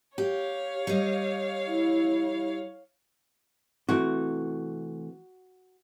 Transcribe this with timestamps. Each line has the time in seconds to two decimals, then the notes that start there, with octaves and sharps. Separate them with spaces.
0.18 G4 C#5 F5
0.87 G3 D#5
1.70 E4
3.89 C3 E3 A3 F#4